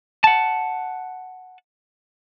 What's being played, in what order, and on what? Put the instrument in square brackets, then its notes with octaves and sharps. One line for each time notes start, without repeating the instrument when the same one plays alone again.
[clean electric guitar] F#5 A5